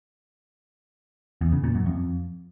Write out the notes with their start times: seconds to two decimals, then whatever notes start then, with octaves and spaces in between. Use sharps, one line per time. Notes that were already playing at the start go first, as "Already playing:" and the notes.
1.41 E2
1.52 C#3
1.64 A#2
1.75 F#2
1.86 F2